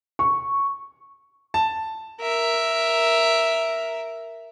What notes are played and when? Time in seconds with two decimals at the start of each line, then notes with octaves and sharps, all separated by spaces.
0.19 C#6
1.54 A5
2.21 A#4 E5